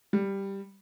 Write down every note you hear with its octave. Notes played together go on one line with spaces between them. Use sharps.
G3